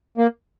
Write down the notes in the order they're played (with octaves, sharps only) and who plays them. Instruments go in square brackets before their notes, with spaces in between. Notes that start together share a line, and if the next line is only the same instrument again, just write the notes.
[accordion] A#3